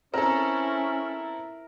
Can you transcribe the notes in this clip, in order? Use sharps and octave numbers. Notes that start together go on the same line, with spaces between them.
C4 C#4 E4 A4 A#4